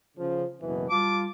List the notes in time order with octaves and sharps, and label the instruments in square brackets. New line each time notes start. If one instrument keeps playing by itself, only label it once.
[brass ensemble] C#3 F3
F#1 B2 E3
[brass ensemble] G3 F4 A5 [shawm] D6